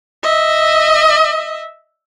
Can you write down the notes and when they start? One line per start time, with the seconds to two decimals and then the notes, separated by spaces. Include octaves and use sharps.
0.23 D#5 E5